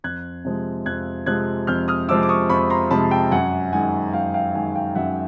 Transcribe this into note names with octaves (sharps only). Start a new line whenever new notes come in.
F2 F#6 G#6
C3 F3 G#3
F2 F#6 G#6
C3 F3 G#3 F#6 G#6
F2 F6 G6
D#6 F6
C3 F3 G#3 D6 E6
D6
C#6 D#6
F2 B5 C#6
A#5 C6
C3 F3 G#3 A5 B5
G5 A5
F#2 F#5 G#5
D#3 G#3 F#5 G#5
F#2 F5 G5
F5 G5
D#3 G#3 F#5 G#5
F5 G5
F#2 E5 F#5